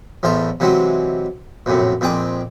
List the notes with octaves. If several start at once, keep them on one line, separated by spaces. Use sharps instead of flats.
A1 E2 A3 C5 A#5
C3 E3 F#3 G#3 C4
A#1 F#2 A2 C3
A#1 F2 C4 G#4 D6